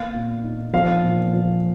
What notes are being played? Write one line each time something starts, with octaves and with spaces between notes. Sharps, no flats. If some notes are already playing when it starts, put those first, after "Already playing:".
Already playing: A#3 F5
A#2
D#4
F3 F5
A#2
F3